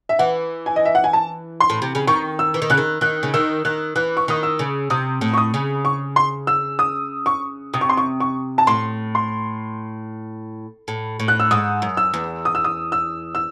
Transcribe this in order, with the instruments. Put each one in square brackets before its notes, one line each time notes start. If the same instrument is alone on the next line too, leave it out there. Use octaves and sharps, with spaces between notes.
[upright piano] E5
[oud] E3 [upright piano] F#5
[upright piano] G#5
D#5
E5
F#5
G#5
A5
C6
[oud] A2
C3
C#3
[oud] D#3 [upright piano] C#6
[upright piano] E6
[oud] E3
D#3
[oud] C#3 [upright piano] F#6
[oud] D#3
[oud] D#3 [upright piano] F#6
[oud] C#3
[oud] D#3 [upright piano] E6
[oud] D#3 [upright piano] F#6
[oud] E3 [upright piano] F#6
[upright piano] C#6
[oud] D#3 [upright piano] D#6
[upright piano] E6
[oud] C#3
[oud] C3 [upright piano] D#6
[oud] A2
[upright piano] C#6
D#6
[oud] C#3
[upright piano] C#6
C6
E6
D#6
C#6
[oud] C3 [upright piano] D#6
[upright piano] C#6
C6
C#6
C#6
A5
[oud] A2 [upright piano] C6
[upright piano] C6
[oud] A2
A2
[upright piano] F#6
E6
[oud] G#2 [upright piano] D#6
[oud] F#2
[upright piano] E6
[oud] E2
[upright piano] D#6
E6
D#6
E6
E6